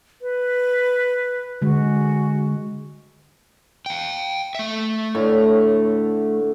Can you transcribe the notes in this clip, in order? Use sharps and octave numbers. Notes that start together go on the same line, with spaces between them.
B4
D3 G#3 F#4
F5 G5
A3 E5
A2 D3 C#5